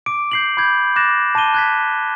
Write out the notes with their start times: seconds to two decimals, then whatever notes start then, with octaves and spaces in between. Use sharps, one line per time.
0.06 D6 D7
0.32 G6 C7 F#7
0.57 B5 D6 G6 G#6
0.96 D6 F#6 G6 A6 A#6 E7
1.35 A5 D6 G#6 D#7 G7
1.54 F#6 G#6 B6